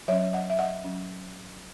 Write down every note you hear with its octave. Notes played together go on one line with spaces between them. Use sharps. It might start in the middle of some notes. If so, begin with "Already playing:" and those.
F#3 C#4 C#5 E5
D#5 F#5
E5
D#5 F#5
F#3 C#4